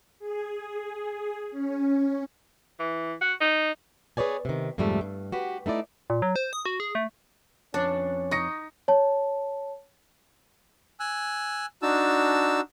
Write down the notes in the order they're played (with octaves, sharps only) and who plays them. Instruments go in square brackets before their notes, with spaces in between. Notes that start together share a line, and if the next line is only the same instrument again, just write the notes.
[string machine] G#4
C#4
[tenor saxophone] E3
F#4
D#4
[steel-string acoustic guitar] G#4 B4 C#5 D5 G#5
C3 D#3
F2 G#2 C3 G3 A3
G2
F#4 G4 B4
A3 D#4 E4 D5
[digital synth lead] A#2
F#3
C5
D#6
F#4
G#4
A3
[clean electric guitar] F2 B4 C#5 [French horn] C#4 [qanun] D4
[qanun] D#4 [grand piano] C#6 A#6 C#7
[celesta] C#5 A5
[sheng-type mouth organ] G#5 E6 F#6
D4 D#4 F#4 A5 E6